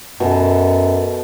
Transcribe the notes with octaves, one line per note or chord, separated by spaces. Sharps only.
F#2 B2 A4